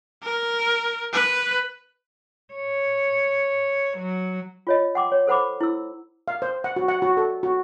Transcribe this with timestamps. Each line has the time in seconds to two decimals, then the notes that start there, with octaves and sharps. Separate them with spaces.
0.23 A#4
1.13 B4
2.54 C#5
3.97 F#3
4.67 F4 C#5 D#5
4.95 F#5 G5 C6 D6
5.12 C#5
5.27 A4 C5 F#5 B5 D6
5.61 E4 E6
6.28 F5
6.42 C5
6.64 F#5
6.76 F#4
6.88 F#5
7.02 F#4
7.17 A4
7.43 F#4